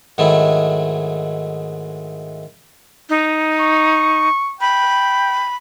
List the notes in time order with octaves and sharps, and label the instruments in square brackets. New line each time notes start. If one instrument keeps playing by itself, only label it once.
[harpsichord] G#2 D#3 F#3 G#3 A3 E4
[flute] D#4
[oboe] C#6
[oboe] G5 [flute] B5